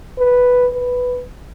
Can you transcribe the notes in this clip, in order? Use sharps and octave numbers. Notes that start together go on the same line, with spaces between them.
B4
B4